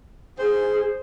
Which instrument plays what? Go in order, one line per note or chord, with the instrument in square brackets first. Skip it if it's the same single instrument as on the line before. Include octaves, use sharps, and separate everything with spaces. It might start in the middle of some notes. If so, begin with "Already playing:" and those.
[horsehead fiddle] G#4 [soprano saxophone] C5